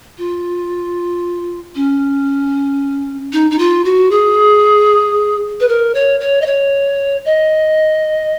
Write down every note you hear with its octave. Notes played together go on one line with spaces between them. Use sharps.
F4
C#4
D#4
D#4
F4
F#4
G#4
B4
A#4
C#5
C#5
D#5
C#5
D#5